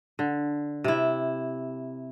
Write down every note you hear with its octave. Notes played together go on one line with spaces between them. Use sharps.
D3
C3 E4